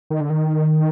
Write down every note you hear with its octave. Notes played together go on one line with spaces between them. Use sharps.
D#3
D3
D#3